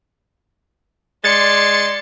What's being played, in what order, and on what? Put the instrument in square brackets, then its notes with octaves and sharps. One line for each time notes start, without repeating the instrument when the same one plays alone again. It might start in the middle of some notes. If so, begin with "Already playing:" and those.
[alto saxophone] G#3 [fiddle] D5 C6 [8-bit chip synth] A6 C#7